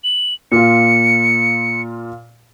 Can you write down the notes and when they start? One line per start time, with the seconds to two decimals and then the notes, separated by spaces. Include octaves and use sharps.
0.04 F#7
0.52 A#2 F4 C#7